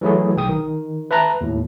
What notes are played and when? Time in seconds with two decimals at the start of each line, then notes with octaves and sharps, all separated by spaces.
0.01 E3 F#3 A3 E4 G#4
0.37 B1 G5 D#6
0.49 D#3
1.11 B4 E5 A5 A#5 F#6
1.41 D#2 A2